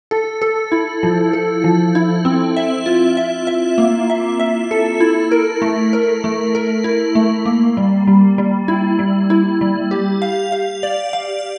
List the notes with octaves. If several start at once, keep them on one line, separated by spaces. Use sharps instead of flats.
A4
A4
E4
F3
A4
F3
E4
C4
E5
F4
E5
E5
A#3
E5
E5
A4
E4
A#4
A3
A#4
A3
A#4
E4
A3
A#3
G3
G3
G3
E4
G3
E4
G3
G4
F5
F5
D5
F5